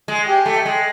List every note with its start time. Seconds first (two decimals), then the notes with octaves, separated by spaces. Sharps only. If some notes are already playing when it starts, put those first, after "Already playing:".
0.08 G#3
0.27 G4
0.46 A3
0.65 G#3